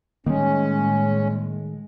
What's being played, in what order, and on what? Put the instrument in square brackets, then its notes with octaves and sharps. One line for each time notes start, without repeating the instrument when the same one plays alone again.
[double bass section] A2 G#3 [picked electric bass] D#3 [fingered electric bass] G3 A#3 [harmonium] C#4